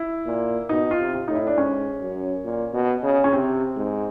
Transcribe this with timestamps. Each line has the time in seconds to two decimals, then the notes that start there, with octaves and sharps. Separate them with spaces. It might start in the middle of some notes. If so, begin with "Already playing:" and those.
Already playing: E4
0.26 A#2
0.69 B2 D#4
0.91 F4
0.99 C3
1.14 F4
1.28 A2 D#4
1.35 E4
1.47 D4
1.57 G#2 C#4
2.01 F#2
2.44 A#2
2.73 B2
3.03 C#3
3.24 C#4
3.33 C3 C4
3.76 G#2